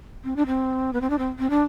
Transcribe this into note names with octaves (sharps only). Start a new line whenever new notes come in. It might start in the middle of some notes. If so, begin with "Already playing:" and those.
C4
D4
C4
B3
C4
D4
C4
C4
D4